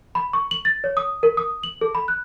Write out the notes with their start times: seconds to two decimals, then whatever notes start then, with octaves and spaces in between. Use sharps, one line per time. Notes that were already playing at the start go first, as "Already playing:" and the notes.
0.15 B5
0.33 C#6
0.51 F#7
0.65 A6
0.84 C#5
0.97 D#6
1.23 A#4
1.37 D#6
1.63 F#7
1.81 A4
1.95 B5
2.08 F#6